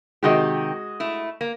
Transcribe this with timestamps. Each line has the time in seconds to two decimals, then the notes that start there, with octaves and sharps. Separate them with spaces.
0.23 C3 D#3 G#3 F#4 G4 D#5
1.00 A3 E4
1.41 A#3